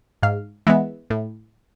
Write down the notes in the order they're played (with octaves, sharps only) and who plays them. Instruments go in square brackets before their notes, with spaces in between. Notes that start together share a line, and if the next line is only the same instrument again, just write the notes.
[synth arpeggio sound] G#2 F5
E3 G#3 B3 E5
A2